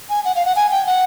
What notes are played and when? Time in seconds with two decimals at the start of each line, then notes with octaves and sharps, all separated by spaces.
0.10 G#5
0.25 F#5
0.36 F5
0.45 F#5
0.56 G#5
0.71 G5
0.87 F#5